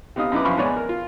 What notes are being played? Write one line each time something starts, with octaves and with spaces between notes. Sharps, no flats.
C3 B3 D#4 F5 D#6
F#2 D#4 E4 B4 D6
F#2 F3 E4 F5 B5 C#6
G#2 B3 C#5 D5 G#5
A#4
F4